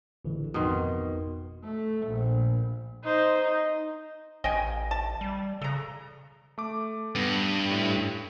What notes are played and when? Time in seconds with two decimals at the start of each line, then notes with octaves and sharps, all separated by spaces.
0.25 A1 D3 E3
0.54 G#1 F2 B2 D#3 C6
1.64 A3
2.07 A#1
3.03 D#4 C5
3.41 D#4
4.44 A1 D#5 G5 G#5
4.91 A5
5.21 G3
5.61 C#3 A4 A#5
6.58 A3 D6
7.15 G2 B3 A#6
7.71 A2